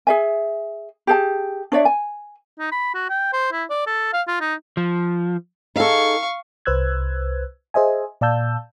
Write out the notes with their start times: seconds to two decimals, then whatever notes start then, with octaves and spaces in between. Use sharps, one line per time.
0.07 G#4 E5 G#5
1.07 G4 G#4 A5
1.72 D4 C#5 D5 E5
1.85 G#5
2.59 D#4
2.72 B5
2.94 F#4
3.09 G5
3.33 C5
3.52 E4
3.70 D5
3.87 A4
4.13 F5
4.27 F4
4.40 D#4
4.77 F3
5.76 D#4 G#4 A4 F5 C#6
6.66 C2 B4 C5 E6 F#6 G#6
7.74 G#4 C5 D#5 E5 G#5
8.21 A#2 D5 F5 A5 E6 G6